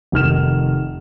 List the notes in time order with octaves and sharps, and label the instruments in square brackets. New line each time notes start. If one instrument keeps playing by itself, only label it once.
[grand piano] F1 D#3 F6 E7